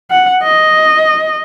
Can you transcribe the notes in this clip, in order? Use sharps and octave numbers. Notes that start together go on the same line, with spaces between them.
F#5
D#5